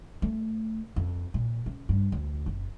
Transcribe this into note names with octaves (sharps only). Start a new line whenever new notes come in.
A3
F2
A#2
C#3
G2
D2
F#1